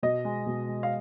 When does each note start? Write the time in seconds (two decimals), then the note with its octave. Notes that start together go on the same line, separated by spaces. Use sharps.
0.03 B2 D#5
0.25 G#3
0.47 B2
0.69 G#3
0.83 F5